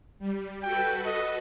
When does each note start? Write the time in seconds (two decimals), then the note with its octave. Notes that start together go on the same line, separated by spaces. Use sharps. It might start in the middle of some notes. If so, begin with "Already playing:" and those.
0.19 G3
0.63 F#4 A4 B4 G5
1.05 D#5